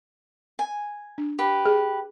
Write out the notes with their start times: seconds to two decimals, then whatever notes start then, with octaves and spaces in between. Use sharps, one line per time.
0.59 G#5
1.18 D4
1.39 G4 B4
1.66 G#4